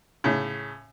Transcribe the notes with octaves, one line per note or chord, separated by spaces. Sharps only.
A2 C#3